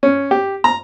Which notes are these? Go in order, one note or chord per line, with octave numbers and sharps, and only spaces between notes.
C#4
G4
A#5